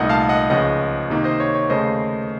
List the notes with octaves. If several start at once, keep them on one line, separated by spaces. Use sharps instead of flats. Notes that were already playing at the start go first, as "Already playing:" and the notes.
Already playing: C2 A#2 A3 D#4 D#5 F#5
F5 A5
D#5 F#5
C#2 C#3 F3 D#5 F#5
C3 D#3 A#3 D#4
C5 D#5
C#5
C#5
D#2 C#3 A3 C5 D#5